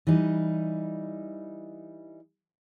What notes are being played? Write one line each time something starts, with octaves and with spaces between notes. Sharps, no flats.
E3 G3 D#4